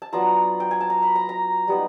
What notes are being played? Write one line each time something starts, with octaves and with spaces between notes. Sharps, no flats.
A5
F#3 B3 D4 F4 A#5
G5
G#5
A5
A#5
B5
A#5
A#5
G3 B3 D#4